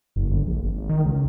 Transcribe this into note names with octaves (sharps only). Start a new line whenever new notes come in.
F#1
G1
A#1
G#1
D#3
C#2